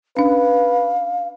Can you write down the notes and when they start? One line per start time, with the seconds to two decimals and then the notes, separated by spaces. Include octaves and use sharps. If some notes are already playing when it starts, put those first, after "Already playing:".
0.17 C#4 D4 B4 F5